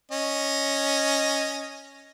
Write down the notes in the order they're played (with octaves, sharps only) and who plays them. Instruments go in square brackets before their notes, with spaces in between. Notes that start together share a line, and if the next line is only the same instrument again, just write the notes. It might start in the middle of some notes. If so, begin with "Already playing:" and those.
[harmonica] C#4 D#5